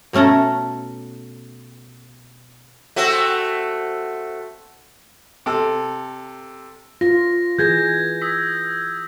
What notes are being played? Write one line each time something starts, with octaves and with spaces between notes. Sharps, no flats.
B2 A3 C#4 A4 A#5
A3 C4 F#4
C3 A4
F4 A#6
E3 G#4 G6 G#6 A#6
D#6 E6 B6